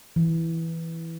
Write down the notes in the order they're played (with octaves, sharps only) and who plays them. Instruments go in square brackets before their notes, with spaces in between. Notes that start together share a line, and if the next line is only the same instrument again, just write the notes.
[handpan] E3